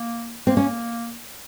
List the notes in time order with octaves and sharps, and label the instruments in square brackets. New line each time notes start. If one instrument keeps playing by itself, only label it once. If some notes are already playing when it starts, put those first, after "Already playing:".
Already playing: [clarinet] A#3
[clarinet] A#3 [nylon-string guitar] C4
[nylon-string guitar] C#4